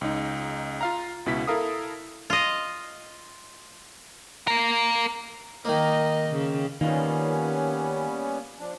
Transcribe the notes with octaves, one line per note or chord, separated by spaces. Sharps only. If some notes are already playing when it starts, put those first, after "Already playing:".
C#2 D#4
F4 F5 A#5
C#2 B2 E4 B6
E4 A4 A#4 F5 D#6
F4 D#5
A#3 A#4
D#3 A#3 A#4 D#5
C#3
D#3 G3 A#3 B3 C#4 F4
F3 D4